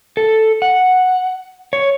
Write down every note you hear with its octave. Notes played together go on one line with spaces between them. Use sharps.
A4
F#5
C#5